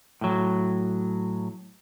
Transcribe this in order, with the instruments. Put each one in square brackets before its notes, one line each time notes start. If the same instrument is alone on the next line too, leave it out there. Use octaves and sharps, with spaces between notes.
[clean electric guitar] A2 F#3